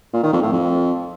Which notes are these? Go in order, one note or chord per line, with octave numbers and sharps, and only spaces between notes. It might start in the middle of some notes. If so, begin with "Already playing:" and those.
A#2
D#3
F2
A2
F2